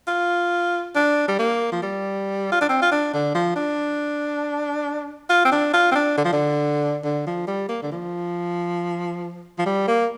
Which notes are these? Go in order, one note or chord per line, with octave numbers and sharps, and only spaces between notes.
F4
D4
G3
A#3
F3
G3
F4
D4
C4
F4
D4
D3
F3
D4
F4
C4
D4
F4
C4
D4
D3
F3
D3
D3
F3
G3
A#3
D3
F3
F3
G3
A#3